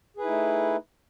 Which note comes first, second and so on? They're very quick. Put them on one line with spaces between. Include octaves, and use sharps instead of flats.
G#4 B4 E4 D#4 A3